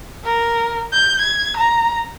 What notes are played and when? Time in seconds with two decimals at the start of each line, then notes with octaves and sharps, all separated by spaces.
0.24 A#4
0.92 G6
1.21 G#6
1.57 A#5